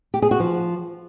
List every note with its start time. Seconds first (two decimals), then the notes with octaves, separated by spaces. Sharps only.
0.14 G4
0.22 G#4
0.31 F#4
0.40 F3